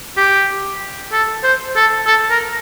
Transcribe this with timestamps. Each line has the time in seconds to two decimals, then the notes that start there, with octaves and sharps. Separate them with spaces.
0.17 G4
1.13 A4
1.44 C5
1.76 A4
2.07 A4
2.31 A#4